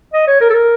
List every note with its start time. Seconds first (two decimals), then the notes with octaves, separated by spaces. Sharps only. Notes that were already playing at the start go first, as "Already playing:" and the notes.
0.14 D#5
0.27 C#5
0.41 A#4
0.50 A4
0.54 A#4